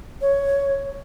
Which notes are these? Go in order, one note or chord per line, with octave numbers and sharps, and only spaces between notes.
C#5